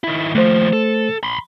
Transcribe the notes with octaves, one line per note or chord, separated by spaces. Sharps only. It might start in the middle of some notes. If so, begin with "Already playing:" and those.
D#3 E4
D#2 F3 A3 C5
A4
B5 C6